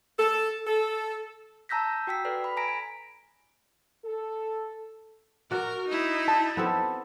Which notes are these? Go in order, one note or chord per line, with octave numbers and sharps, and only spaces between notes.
A4
A4
A5 A#5 E6 G6 A#6 B6
F#4 G5 E6 B6
A4 B4 D5
B5
G#5 A#5 A#6 B6 D7
G#5
A4
F#4 A#4 D5
D#4 E4
A5
B3 C4 A4